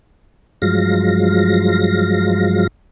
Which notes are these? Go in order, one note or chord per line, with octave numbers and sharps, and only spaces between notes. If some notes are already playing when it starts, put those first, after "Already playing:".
G2 F3 F#3 G#3 F5 A#6